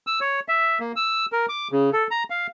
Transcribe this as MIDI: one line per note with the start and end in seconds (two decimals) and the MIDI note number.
0.07 0.20 88
0.21 0.40 73
0.48 0.79 76
0.80 0.92 58
0.96 1.26 88
1.32 1.46 70
1.49 1.68 86
1.72 1.90 49
1.93 2.07 69
2.11 2.24 82
2.30 2.47 77